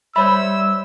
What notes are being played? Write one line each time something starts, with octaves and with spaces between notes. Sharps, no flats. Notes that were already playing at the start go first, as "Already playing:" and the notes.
G3 C5 C#5 E5 B5 E6